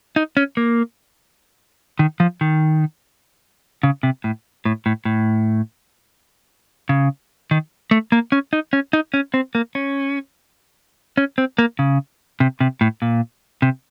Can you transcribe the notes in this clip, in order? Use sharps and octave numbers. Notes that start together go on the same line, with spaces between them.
D#4
C#4
A#3
D#3
F3
D#3
C#3
C3
A2
A2
A2
A2
C#3
D#3
A3
A#3
C#4
D#4
C#4
D#4
C#4
C4
A#3
C#4
C#4
C4
A#3
C#3
C3
C3
A2
A#2
C3